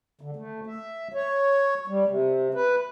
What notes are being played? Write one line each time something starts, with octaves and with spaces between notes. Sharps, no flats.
D3
A3
E5
C#5
G3
C3
B4